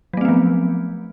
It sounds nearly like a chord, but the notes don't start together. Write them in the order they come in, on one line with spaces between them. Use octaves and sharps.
F#3 A3 C4 B3 F3